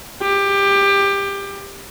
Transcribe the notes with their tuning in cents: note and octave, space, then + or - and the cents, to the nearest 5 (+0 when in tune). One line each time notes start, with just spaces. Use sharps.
G4 +20